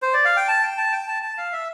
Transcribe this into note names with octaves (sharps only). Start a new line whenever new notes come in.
C5
D5
F5
G5
A5
G5
A5
G5
A5
A5
F5
E5